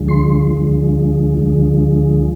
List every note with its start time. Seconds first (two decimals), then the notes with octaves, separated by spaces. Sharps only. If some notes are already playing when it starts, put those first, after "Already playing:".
Already playing: D2 D3 F3 G#3
0.08 C6
0.51 D2 D3 F3 G#3
1.37 D2 D3 F3 G#3